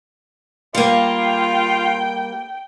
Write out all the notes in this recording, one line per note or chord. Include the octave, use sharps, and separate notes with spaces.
G3 A#3 F4 G5